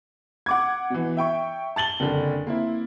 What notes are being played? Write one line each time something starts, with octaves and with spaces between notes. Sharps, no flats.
F#5 D6 G#6
B2 E3
E5 G5 C#6
A5 A6 F#7 G7
F#1 F2 D3
A#3 C4 E4